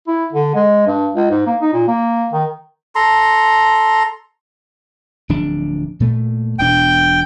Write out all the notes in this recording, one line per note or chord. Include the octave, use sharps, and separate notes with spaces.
E4
D3
G#3
G2
C#2
G#2
A#3
D#4
A#2
A#3
D#3
A4 A#5 C6
D1 F3 D4
A#2 A3
E1 B2 D4 G5